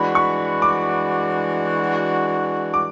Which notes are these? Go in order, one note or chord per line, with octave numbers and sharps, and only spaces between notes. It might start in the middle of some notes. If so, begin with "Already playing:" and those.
Already playing: E3 G#3 D4 F#4 B5
C#6
D6
D6